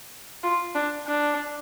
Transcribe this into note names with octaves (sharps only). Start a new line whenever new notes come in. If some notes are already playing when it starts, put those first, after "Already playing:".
F4
D4
D4